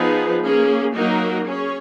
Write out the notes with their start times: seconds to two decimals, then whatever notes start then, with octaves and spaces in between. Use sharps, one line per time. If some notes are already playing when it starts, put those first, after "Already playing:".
Already playing: F3 B3 D#4 G#4 B4
0.43 A#3 C#4 G#4
0.95 F#3 A#3 D#4 F#4 A#4
1.45 C#4 G#4 C#5